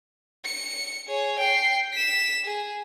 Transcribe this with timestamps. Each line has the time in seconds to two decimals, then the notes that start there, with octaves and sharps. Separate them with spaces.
0.45 C#7
1.08 G#4 C#5
1.39 G5 C7
1.93 B6 E7
2.45 G#4